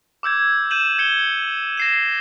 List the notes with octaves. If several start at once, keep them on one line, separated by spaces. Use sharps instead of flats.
D6 E6 G6 G#6
G6 D#7 E7 F#7
G#6 C#7 G7
A#6 C7 E7